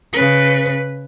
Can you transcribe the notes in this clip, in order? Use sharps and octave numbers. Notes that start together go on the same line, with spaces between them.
C#3 B4